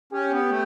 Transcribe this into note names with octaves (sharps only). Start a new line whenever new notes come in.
C#4 G4
B3
A3